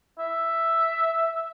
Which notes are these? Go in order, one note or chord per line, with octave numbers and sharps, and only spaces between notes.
E5